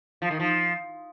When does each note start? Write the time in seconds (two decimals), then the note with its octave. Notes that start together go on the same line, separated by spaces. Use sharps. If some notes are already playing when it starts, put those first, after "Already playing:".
0.22 F3
0.31 D#3
0.40 F3